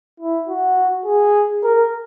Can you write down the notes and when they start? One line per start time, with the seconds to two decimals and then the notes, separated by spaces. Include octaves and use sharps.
0.20 E4
0.48 F#4
1.06 G#4
1.64 A#4